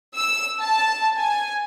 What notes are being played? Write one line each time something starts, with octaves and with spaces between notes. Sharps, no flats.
E6
A5
G#5